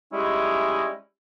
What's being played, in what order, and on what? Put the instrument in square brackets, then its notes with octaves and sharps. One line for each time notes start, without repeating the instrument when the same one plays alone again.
[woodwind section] G3 G#3 C#4 D#4 E4